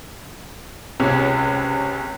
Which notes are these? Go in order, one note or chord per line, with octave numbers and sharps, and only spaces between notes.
C#2 C3 C#4